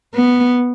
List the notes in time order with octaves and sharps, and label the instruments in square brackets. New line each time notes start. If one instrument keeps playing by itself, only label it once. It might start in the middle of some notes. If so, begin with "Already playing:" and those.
[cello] B3